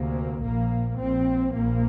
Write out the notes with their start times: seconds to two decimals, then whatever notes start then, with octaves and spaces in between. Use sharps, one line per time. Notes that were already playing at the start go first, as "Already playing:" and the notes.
Already playing: D2 C3 A#3
0.42 A#1 A#2 A#3
0.98 A#1 A#2 C4
1.54 A#1 A#2 A#3